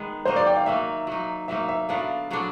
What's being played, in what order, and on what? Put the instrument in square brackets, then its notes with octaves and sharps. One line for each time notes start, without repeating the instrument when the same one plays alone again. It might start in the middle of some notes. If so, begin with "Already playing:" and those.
Already playing: [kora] D#3 G#3 B3
[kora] F#3 A#3 D#4 [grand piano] C5
[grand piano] D5
G5
F5
[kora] F#3 A#3 D#4 [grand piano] E5
[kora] F#3 A#3 D#4
[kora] F#3 A#3 D#4 [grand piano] E5
[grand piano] E5
[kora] D3 F#3 B3 D4 [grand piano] F5
[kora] D3 F#3 B3 D4